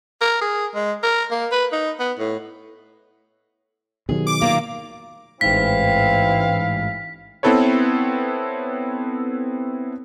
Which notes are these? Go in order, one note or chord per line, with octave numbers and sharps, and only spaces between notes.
A#4
G#4
G#3
A#4
A#3
B4
D#4
B3
A2
B2 D#3 F#3 G#4
D6
A#2 A#3 F5
A1 G#2 E3 C4 E4 F5 B6
B3 C4 E4 A4 B4 C#5